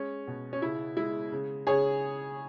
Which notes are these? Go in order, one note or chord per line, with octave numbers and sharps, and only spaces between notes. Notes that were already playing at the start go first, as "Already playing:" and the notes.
Already playing: G#3 C#4
B2
C#4
C#3 E4
G#3 E4
C#3
C#3 G#4 C#5